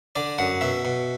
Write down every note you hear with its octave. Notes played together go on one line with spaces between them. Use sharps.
D3 D5
F#2 F#5
B2 E5
B2